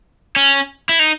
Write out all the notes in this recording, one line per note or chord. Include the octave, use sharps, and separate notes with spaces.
C#4
E4
D#4